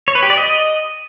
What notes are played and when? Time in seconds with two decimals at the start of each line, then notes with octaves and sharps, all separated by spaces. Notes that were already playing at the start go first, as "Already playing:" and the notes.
0.08 C#5
0.15 B4
0.23 G4
0.30 D5
0.37 D#5